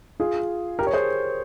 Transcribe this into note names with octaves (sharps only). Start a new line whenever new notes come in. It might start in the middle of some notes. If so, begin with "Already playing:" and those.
F4 G#4
G4 A#4
C#5
G#4 C5